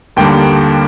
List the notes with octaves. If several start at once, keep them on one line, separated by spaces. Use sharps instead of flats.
D#2 D3 G3 A#3 G5